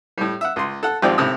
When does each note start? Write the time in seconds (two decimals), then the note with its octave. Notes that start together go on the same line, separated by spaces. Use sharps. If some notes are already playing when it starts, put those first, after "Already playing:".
0.18 A2 G3
0.41 E5 F#5
0.56 C#2 C6
0.83 A4 F#5
1.02 G#1 G#2 F3 C4 G4 D5
1.18 G#1 A2 C3 E4 D#6 E6